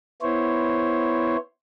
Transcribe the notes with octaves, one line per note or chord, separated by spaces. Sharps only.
B3 E4 C5 C#5